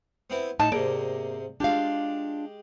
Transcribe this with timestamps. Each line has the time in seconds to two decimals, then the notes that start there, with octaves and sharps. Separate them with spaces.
0.30 B3 C4 E4
0.60 A2 D#4 A4 A5
0.72 G#2 C3 A#3 D5
1.60 G#3 D4 F4 G4 F5